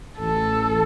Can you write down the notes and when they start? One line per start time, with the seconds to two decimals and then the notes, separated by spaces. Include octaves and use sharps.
0.20 A1 A4